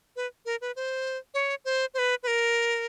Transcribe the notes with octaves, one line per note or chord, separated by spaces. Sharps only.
B4
A#4
B4
C5
C#5
C5
C5
B4
B4
A#4